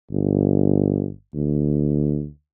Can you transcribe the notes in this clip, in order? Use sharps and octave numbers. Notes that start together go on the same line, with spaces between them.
G1
D2